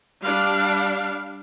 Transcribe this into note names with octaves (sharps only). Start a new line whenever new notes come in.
G3 D4 F5